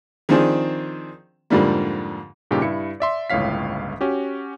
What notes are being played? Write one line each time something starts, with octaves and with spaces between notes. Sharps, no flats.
D#3 F3 C4 D4 G#4
F2 G#2 D3 F3 G3 A#3
G2 A#2 C#3 D#4 G4
G2 E4 C#7
D5 E5 C6
G1 C#2 A2 C#5 F5 B6
C#4 F#4 G4